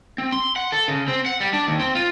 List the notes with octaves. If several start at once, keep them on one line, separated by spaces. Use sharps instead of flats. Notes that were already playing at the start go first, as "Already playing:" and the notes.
C4
C6
F#5
A4
C#3
C4
F#5
G3
D4
D#2
C4
F4